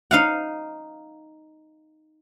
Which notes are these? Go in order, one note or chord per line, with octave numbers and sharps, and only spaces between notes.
D#4 F5 F#5